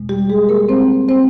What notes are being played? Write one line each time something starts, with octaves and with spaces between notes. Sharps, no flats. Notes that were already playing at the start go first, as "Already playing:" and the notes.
Already playing: E2 B2 G#3
G3 G4
G#3 G#4
A#3 A#4
C4 C5
C4 C5